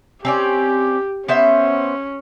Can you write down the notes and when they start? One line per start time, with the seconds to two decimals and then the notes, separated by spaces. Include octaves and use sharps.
0.25 C4 C#4 G4 D5
1.28 B3 C#4 C5 E5